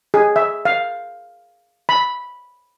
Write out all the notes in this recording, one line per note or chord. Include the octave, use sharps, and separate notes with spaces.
G#4
E5
F5
B5